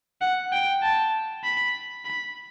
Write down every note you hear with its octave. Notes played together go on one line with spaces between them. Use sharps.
F#5
G5
A5
B5
B5